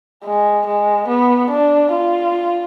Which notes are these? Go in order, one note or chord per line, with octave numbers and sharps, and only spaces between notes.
G#3
G#3
B3
D4
F4